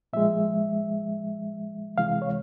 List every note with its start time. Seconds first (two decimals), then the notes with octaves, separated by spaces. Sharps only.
0.13 A#2 F3 G#3 E5
1.98 C#2 C3 E3 G#3 F5
2.22 C#5